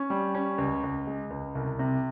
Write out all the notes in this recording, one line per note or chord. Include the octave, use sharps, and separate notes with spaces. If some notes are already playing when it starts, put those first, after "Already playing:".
Already playing: C#4
G3
C#4
C#2
C#2
G#3
C#2
C2
C3